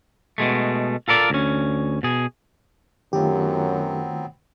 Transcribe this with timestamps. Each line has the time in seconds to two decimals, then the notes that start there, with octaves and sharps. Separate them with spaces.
0.38 B2 G#3 A3
1.08 F4 A4 A#4 D5
1.30 D2 C#4
2.03 B2 G#4
3.13 F#2 D#3 F#3 A3 B3 C4 F4 G4